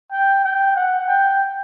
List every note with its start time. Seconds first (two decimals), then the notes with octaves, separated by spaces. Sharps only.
0.12 G5
0.44 G5
0.76 F#5
1.08 G5